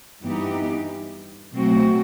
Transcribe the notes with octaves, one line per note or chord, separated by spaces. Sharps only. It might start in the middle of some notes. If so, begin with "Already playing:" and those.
G2 E3 B3 D#4 G4
B2 F#3 A3 C4 F#4